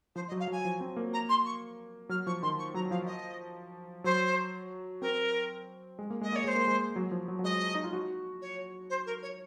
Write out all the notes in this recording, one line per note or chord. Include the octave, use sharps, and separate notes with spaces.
F3 C5
D#5
F#3
F5
F#3
G#5
F3
C4
A#3
A#5
C6
C#6
F#3 F6
F3 C#6
D#3 C6
C#6
F#3 A#5
F3 F5
D#5
F#3 C5
C4 A#4
G#3
A#3
G#3 D#5
A#3 C#5
G#3 C5
A#3
G#3
F#3
F3
F#3
F#3
G#3 D#5
D#4
F4
F#4
C#5
C5
A#4
C#5